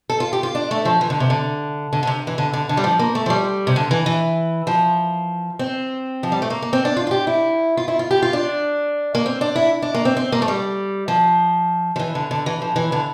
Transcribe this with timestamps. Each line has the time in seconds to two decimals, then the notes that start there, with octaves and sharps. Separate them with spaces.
0.10 A4
0.20 F4
0.33 G4
0.43 F4
0.55 D4
0.71 A3
0.85 F3
1.01 E3
1.10 D3
1.20 C3
1.30 D3
1.93 D3
2.03 D3
2.07 C3
2.27 E3
2.38 D3
2.54 D3
2.69 D3
2.77 G3
2.84 F3
2.99 A#3
3.15 A3
3.26 F3
3.30 G3
3.67 C3
3.76 D3
3.91 E3
4.06 E3
4.67 F3
5.59 C4
6.23 F3
6.32 G3
6.42 A3
6.50 A#3
6.62 A#3
6.73 C4
6.85 D4
6.97 F4
7.07 F4
7.11 G4
7.27 E4
7.77 F4
7.88 E4
7.99 F4
8.11 G4
8.22 F4
8.33 D4
9.15 A#3
9.26 C4
9.41 D4
9.56 E4
9.82 D4
9.95 A#3
10.05 C4
10.17 C4
10.32 A#3
10.42 A3
10.48 G3
11.08 F3
11.96 F3
11.99 E3
12.15 D3
12.31 D3
12.46 E3
12.62 F3
12.76 E3
12.92 D3